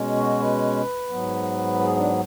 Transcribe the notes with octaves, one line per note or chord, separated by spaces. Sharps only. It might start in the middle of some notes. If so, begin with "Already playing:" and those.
Already playing: B2 G#3 C#4
F#4
B4
G#2 F#3 B3
G#4
D4